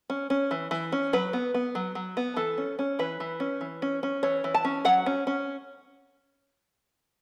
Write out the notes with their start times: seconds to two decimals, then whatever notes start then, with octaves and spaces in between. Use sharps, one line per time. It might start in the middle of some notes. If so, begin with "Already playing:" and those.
0.10 C#4
0.30 C#4
0.51 E3
0.71 E3
0.92 C#4
1.13 F#3 B4
1.33 B3
1.54 B3
1.75 F#3
1.95 F#3
2.17 B3
2.36 E3 A4
2.58 C#4
2.79 C#4
2.99 E3 B4
3.20 E3
3.40 C#4
3.61 E3
3.82 C#4
4.03 C#4
4.23 E3 C#5
4.44 E3
4.54 A5
4.65 C#4
4.85 F#3 F#5
5.06 C#4
5.27 C#4